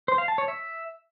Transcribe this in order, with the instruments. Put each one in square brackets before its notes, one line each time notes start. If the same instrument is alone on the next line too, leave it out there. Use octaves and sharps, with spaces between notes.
[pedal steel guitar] C5
F5
A5
C#5
E5